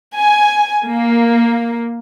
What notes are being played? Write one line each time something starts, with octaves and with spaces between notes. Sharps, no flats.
G#5
A#3